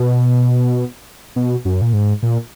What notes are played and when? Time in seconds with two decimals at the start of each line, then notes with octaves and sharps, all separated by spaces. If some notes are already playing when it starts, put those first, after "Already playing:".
Already playing: B2
1.36 B2
1.65 F#2
1.82 A#2
1.93 G#2
2.23 A#2